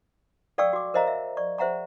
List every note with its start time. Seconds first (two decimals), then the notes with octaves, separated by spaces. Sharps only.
0.58 A4 D5 F5 G5 C#6 E6
0.73 F#4 D6
0.94 A#4 C5 D#5 F5 A#5
1.07 E5
1.37 D5 C#6
1.58 G#4 C5 E5 F#5 A#5 C#6